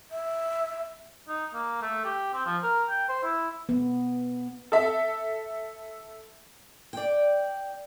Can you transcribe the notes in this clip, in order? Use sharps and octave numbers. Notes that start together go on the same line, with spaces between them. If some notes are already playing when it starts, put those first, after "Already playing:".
E5
D#4
A#3
A3
G4
C4
F3
A#4
G5
C5
E4
B3
A4 E5
D5 G5